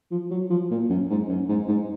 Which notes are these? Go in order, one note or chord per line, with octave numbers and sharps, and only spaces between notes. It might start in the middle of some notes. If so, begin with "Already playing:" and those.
F3
F#3
F3
A#2
F#2
G#2
F#2
G#2
G#2